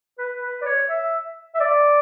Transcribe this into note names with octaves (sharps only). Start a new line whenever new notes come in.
B4
B4
D5
C#5
E5
E5
D5